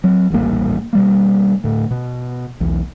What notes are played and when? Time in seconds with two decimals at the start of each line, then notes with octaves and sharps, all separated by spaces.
0.04 F#3 C4
0.30 D#1 A1 G2 A#3
0.93 B2 G3 A#3
1.64 D2 A2
1.91 B2
2.60 B1 E2